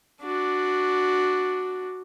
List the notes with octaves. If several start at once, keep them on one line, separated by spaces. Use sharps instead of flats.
D4 F#4